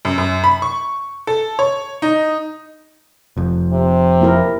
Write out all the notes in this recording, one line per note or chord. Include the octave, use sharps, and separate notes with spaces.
F#2
F#2
B5
C#6
A4
C#5
D#4
F1 F2
C3
A#3 E4 A#4